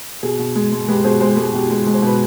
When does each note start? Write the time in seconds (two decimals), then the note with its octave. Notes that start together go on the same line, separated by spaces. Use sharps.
0.23 B2 G#4
0.39 B2
0.56 G#3
0.72 G#3
0.88 G#3 G4 B4
1.04 B2 G#4 C5
1.21 G#3 G#4 C5
1.37 G#3 G#4
1.54 B2 G4
1.70 G#3
1.87 G#3
1.94 C5
2.02 B2 B4